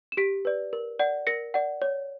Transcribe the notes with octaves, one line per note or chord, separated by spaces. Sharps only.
E7
G4 B6 D7
B4 D5
A#4
D5 F#5
A#4 A#6 C#7
D5 F#5
C#5